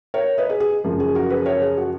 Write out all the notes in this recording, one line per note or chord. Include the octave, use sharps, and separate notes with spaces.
A#4 C#5
B4 D#5
G#4
G#4
F#2 C#3 F3
G#4
F#4 A#4
G#4 B4
A#4 C#5
G#4
F#4